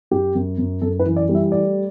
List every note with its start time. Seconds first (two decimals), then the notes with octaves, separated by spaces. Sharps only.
0.11 F#2 G4
0.35 F#2
0.58 F#2
0.82 F#2 A4
0.99 B4
1.06 E3
1.17 D5
1.29 G3
1.35 E5
1.52 A3 D5